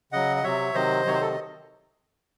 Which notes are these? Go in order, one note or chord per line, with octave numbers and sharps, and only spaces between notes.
C#3 F#3 D#5 F#5
D#5
C3 F#3 C#5 E5
C3 D#3 F#3 C5 D#5
C3 D#3 F#3 C#5
C5
A4